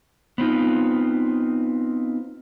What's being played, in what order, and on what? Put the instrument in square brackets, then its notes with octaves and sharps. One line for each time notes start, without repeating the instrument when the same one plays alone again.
[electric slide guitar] B3 C4 D#4 F4